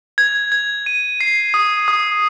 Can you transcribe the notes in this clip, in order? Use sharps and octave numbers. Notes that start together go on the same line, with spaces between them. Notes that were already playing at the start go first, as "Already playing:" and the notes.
G#6
G#6
D#7
C7
D#6
D#6